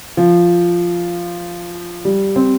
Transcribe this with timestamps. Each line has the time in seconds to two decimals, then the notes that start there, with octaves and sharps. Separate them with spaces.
0.17 F3
2.05 G3
2.36 C4